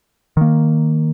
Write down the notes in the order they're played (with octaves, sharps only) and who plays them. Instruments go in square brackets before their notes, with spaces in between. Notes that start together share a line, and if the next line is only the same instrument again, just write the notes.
[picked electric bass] D#3 A#3